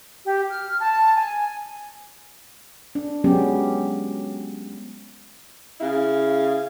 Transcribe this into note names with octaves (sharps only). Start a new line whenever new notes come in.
G4
F6
A5
G#5
D4
F#3 G#3 B3 C#4 G4
C#3 E4 F5